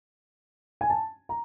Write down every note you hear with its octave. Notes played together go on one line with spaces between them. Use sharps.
G#5
A5
A#5